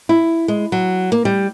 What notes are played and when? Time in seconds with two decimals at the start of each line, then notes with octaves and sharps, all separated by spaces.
0.09 E4
0.48 G#3
0.72 F#3
1.12 A#3
1.25 G3